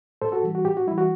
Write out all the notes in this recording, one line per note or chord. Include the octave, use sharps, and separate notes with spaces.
A2 A4 C5
F#4 A4
E3 G3
F#4
A2 G4
F#4
E3 G3 E4
F#4